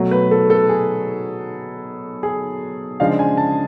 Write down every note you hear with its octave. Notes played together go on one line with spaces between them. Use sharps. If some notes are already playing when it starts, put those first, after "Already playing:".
Already playing: B2 F#3 A3
B4
A4
A4
G#4
G#4
C#3 F3 G#3 D4 F5
G#5
A5